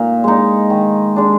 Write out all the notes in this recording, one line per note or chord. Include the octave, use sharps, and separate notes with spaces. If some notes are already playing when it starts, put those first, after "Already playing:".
Already playing: A#2 D#4
G#3 D#4
D#3
G#3 D4